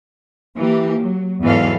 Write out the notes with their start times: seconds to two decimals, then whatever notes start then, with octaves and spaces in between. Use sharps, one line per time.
0.55 E3 A#3 G4
1.00 F#3
1.42 E2 G#2 E3 F#3 A4 F5